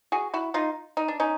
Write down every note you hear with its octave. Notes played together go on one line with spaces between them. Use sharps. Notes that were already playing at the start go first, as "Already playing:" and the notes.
F#4 G#4
E4 F#4
D#4 F4
D#4
D4
C#4 D#4